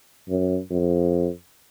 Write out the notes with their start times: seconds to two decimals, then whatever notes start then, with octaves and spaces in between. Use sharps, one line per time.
0.29 F#2
0.70 F2